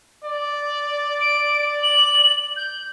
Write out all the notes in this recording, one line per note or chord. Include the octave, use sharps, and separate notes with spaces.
D5
D7
F#7
G6